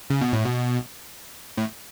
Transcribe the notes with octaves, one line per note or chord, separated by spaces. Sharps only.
C#3
B2
A2
B2
A2